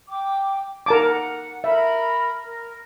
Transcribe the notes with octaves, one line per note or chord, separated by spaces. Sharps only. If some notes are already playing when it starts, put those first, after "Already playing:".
G5 D6
A#4 F#5 A5 D6
A#4 E5 B5
A#4